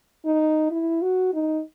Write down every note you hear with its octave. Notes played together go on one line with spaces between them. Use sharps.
D#4
E4
F#4
D#4